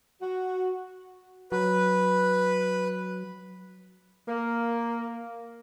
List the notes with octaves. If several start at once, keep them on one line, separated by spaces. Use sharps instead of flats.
F#4
F#3 B4
A#3